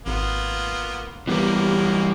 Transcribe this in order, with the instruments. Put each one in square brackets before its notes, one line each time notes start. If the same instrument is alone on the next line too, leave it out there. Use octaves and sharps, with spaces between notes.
[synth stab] G#1 [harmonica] A#3 B3 F4
[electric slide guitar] E3 G3 [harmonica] A#3 [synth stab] B3 G4